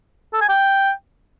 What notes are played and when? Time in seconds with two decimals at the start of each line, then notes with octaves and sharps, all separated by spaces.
0.34 A4
0.41 G#5
0.49 G5